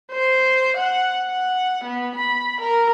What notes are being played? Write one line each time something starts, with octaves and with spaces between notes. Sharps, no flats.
C5
F#5
F#5
B3
B5
A#4